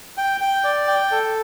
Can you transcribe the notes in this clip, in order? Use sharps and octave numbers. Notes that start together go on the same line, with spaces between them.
G5
G5
D5
G5
A4